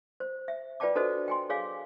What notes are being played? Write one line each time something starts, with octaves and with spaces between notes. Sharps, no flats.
C5
E5
F4 B4 D5 G5 A5 D6
D4 F#4 A4 B4 C5 D#5
G5 G#5 C6
G#4 C#5 F5 G#5 D6